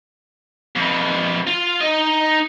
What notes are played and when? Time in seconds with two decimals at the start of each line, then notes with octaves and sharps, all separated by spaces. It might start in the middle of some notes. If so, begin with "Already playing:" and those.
0.76 F2 E3
1.47 F4
1.81 D#4 D#5